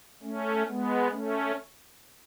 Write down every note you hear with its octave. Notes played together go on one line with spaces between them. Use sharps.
A3 C#4
G#3 B3
A3 C#4